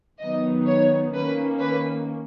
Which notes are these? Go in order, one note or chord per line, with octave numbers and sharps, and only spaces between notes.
D#3 F#3 B3 D#4 D#5
C#5
D#3 A#3 C#4 B4
B4